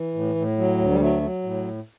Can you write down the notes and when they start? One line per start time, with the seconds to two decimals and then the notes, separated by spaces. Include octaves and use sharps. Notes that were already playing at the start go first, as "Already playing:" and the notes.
Already playing: E3
0.14 A2
0.35 A2
0.58 F#3
0.78 D2
0.90 G3
1.00 F#3 A3
1.22 F#3
1.43 A2